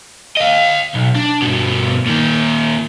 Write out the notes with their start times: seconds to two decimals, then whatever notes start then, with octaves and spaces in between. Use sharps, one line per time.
0.37 D#5 F5
0.94 B1
1.15 D4
1.42 G2 B2
2.07 A#2 D#3